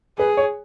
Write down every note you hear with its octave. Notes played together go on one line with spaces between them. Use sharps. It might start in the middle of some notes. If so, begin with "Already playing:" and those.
G#4 B4
C#5